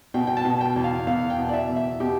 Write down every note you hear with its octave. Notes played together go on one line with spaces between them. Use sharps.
B2 G5
G5
A5
B2
G5
E2
F5
E2 F5
G5
B2
D5
E5
E2
E5
B2 G4